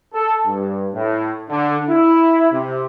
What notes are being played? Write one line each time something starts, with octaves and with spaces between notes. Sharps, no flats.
A4
G2
A2
D3
E4
C3